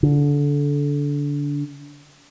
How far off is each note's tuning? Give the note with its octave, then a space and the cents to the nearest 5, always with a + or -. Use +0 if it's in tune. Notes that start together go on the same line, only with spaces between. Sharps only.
D3 -25